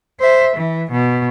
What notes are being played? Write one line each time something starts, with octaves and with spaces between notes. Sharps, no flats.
C5 E5
E3
B2